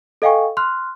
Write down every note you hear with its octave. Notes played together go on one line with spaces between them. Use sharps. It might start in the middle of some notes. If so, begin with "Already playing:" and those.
A4 D#5 F5 G5 G#5 C#6
C6 F6 F#6